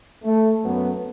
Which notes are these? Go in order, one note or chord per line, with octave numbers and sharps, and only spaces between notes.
A3
F#2 F#3 B3